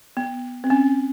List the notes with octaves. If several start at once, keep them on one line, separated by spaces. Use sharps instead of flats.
B3
C4
C#4